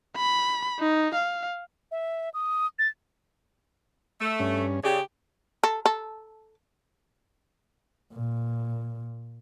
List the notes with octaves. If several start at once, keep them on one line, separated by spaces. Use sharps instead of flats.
B5
D#4
F5
E5
D#6
A6
A3 E6
G2 C#4
C#3 G4 D5
A4
A4
A#2